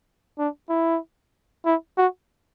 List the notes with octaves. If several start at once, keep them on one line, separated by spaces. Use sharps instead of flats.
D4
E4
E4
F#4